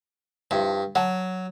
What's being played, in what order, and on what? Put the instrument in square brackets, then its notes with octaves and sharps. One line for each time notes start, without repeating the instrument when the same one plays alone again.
[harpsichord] G2 [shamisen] F3 E4 A5
[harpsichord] F#3 [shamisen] F#5 A5